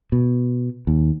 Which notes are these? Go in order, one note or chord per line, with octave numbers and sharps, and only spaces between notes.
B2
D#2